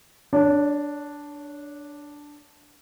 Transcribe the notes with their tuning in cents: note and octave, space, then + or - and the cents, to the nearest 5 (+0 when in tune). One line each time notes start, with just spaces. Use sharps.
D4 +0 C#5 +30